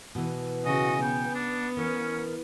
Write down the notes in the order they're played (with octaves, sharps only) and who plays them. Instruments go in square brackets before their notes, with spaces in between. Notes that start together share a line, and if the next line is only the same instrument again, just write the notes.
[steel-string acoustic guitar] B2 E3
[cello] C#3 F#4 [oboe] D#5 [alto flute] G#5
[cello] B3 [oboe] G5
[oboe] D4
[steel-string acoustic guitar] E3 [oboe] C#4 [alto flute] A#4